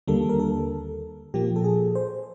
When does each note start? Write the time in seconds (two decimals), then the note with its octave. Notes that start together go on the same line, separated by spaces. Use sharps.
0.08 D#2 D3 G3 A#3 A4
0.29 A#4
0.40 A4
1.34 A#2 F3 A#3 G4
1.56 A4
1.64 G#4
1.95 C5